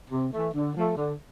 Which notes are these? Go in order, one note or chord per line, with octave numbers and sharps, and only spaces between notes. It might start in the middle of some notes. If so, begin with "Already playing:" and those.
C3
E3 A3
D3
F3 A3
D3